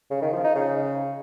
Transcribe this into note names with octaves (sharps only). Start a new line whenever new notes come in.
C#3
D#3
F3
D#4
C#3